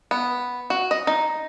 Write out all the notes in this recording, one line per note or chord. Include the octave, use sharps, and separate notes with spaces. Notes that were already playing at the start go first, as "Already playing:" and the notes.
B3
F#4
D#5
D#4